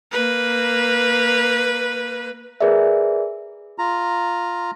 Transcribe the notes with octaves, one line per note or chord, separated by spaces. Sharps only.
A#3 B4
G#4 A#4 B4 D5 E5
F4 A#5